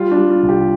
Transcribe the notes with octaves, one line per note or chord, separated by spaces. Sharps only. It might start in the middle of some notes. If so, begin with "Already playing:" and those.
Already playing: G3 F4
D4
G3
F4
C2
G4